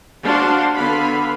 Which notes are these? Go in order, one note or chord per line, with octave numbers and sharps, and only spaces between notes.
D4 F#4 C5 F5 C6
D3 B3 F5 B5